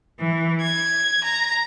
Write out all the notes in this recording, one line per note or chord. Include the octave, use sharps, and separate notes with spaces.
E3
G#6
A#5